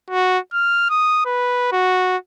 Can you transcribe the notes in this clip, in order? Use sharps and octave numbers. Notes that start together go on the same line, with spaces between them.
F#4
F6
D#6
B4
F#4